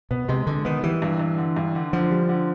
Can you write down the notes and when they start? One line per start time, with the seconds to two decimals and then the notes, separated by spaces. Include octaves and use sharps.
0.11 B2 B3
0.28 C3 G#3
0.46 D3 G#3
0.65 D#3 B3
0.83 E3 G3
1.02 G2
1.19 G2
1.38 D3
1.57 G2
1.75 D3
1.93 D3 F3
2.11 G3
2.29 D3